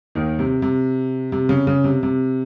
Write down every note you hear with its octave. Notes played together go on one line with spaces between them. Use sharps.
D#2 D#3
C3
C3
C3
C#3
C#3
C3
C3